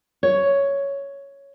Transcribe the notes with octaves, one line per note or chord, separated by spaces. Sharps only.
C#5